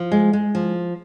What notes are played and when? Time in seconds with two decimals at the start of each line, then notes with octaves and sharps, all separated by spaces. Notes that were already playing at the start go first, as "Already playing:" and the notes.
Already playing: F3
0.12 G#3
0.33 G#3
0.55 F3